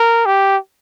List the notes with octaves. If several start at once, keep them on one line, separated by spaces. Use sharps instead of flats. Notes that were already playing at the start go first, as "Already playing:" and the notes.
Already playing: A#4
G4